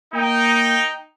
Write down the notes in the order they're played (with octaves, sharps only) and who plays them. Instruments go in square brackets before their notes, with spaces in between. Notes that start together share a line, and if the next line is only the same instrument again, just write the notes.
[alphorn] A#3 [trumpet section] D#4 G5